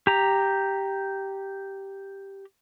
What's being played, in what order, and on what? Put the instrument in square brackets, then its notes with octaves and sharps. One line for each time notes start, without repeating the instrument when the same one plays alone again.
[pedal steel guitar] G4 A#5